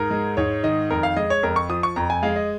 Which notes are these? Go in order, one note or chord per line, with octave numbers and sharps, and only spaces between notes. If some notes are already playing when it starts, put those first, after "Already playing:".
Already playing: G#2 A#4
G#3
G#2 C#5
D#3 D#5
F2 A#4
F5
G#3 D#5
C#5
F2 A#4
C#6
F3 D#6
C#6
F2 A#5
G#5
G#3 F5
D#5